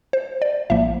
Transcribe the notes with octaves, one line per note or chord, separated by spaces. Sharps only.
C5
D5
A#1 A2 F3 A#3 E5